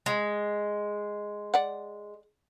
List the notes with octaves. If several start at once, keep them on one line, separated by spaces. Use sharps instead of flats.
G#3
D5 F#5